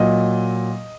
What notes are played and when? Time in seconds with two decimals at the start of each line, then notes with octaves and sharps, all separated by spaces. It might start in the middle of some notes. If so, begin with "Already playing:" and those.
Already playing: A#2 F#3 D#5